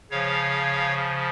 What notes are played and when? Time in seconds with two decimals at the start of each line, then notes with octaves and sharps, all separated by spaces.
0.10 C#3 F3 C#5 F5